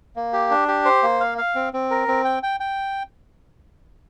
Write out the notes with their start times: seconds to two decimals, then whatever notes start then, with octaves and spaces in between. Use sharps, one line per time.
0.16 A#3
0.33 G4
0.51 D4
0.68 G4
0.85 C5
1.03 A#3
1.20 F5
1.38 F5
1.55 C4
1.73 C4
1.91 A#4
2.08 C4
2.25 G5
2.43 G5
2.60 G5